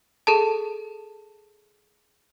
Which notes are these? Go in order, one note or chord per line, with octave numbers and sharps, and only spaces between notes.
G#4 A4 A5